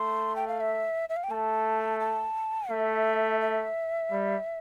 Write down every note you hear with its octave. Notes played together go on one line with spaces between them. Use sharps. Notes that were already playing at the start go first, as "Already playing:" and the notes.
Already playing: A3 C6
G5
F5
E5
E5
F5
G5
A3 A5
A5
A3 E5
E5
G3